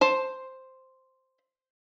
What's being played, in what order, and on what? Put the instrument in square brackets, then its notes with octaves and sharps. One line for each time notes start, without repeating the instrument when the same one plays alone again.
[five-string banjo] C5 A5